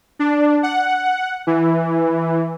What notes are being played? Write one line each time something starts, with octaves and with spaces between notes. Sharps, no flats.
D4
F#5
E3